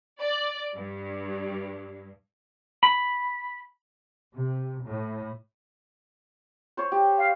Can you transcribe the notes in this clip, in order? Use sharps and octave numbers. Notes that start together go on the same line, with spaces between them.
D5
G2
B5
C3
A2
C5 C#5
G4
F5